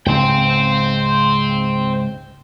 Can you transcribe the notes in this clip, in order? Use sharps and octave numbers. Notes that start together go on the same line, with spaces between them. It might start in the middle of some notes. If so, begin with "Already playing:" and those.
C#2 G#2 C#3 C5 G5